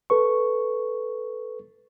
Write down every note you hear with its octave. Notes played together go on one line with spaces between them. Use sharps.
A4 B4 C#6